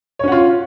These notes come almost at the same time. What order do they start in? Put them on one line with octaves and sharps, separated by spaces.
C#5 C#4 F#5 F4